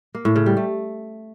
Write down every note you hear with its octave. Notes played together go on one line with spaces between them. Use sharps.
A#3
A2
C#3
G3
A3